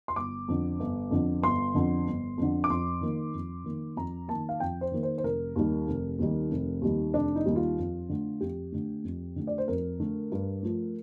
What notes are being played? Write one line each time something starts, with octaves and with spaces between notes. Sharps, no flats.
C6
G1 D6
F2 D3
G1
F2 D3
G1 C6
F2 D3
G1
F2 D3
D6
F2 C6
D#3 A#3
F2
D#3 A#3
F2 A#5
D#3 A#3 A5
F5
F2 G5
C5
D#3 A#3
C5
C5
F1 A#4
D#2 D#3 G3
F1
D#2 D#3 G3
F1
D#2 D#3 G3
F1 D4
D#4
D#2 D#3 G3
F4
F2
D3 A3
F2 G4
D3 A3
F2
D3 A3
D5
C5
F2 A#4
D3 A3
G2
F3 A3